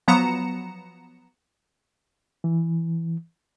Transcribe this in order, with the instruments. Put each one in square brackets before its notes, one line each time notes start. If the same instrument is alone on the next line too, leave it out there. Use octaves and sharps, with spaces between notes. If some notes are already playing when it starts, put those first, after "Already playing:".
[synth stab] F3 F#3 B3 A#5 C#7 E7
[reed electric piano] E3